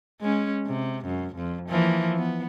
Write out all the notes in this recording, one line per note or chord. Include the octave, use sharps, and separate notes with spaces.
G#3 C#4
C3
F#2
F2
E3 F3 A#3
B3